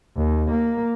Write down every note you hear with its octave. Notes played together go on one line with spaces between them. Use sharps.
D#2
A#3